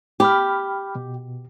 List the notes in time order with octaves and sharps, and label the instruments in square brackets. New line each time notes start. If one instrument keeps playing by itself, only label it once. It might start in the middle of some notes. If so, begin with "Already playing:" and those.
[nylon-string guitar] G4 [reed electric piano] G5 B5 F6
[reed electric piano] B2